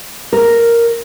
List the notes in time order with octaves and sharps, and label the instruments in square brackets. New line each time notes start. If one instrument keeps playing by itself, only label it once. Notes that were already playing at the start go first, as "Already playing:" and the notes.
[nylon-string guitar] A#4